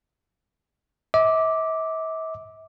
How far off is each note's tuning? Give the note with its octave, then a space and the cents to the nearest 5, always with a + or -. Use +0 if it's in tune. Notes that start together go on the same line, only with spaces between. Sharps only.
E5 -45 D6 +0